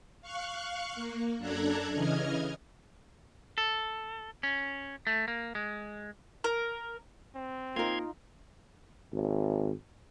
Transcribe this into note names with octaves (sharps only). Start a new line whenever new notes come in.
F5 C#6 F#6
A#3
F#2 D4 A4 A#5 F#6 G#6
C#3 E3 D#5 F6 G#6
A4
C#4
A3
A#3
G#3
A#4
C4
A#3 D#4 F4 A#4 C6 F6 G#6
G#1